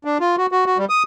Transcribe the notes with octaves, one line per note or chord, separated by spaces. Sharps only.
D4
F4
F#4
F#4
F#4
G3
D#6